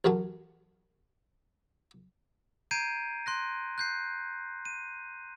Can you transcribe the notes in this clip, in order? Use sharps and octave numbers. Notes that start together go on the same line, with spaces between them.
A1 F#2 F#3 A5
A#5 G6 G#6 C7 D7 D#7
C6 F#6 A#6
F#6 G6 C7
D#7